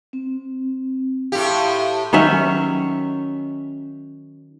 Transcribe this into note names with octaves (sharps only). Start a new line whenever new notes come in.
C4
A2 G4 F5 C6
D#3 F#3 C#4 E5